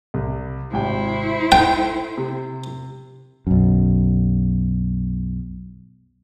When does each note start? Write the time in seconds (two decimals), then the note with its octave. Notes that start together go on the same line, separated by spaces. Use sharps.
0.14 C2
0.73 G#1 C3 E4 C5 G5
1.52 A4 G5 D7
2.17 C3
3.47 B1 F#2